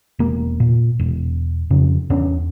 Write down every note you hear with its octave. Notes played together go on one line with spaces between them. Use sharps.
E1 A#3
A#2
E1
F2 C#3
E2 B3 C#4 D4